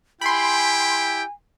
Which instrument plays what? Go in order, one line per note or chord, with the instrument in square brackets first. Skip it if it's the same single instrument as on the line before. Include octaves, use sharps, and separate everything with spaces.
[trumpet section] E4 G4 G5 [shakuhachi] G#5 [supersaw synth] B5 C6